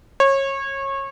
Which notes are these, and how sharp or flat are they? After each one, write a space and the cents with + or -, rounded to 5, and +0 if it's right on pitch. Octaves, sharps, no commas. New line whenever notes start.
C#5 -25